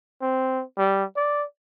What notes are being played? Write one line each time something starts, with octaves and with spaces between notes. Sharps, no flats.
C4
G3
D5